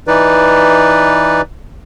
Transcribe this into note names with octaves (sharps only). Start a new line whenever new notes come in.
E3 D#4 B4 D5